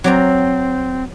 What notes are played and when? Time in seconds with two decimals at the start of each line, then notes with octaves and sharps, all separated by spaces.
0.04 F#3 C4 D5 A#5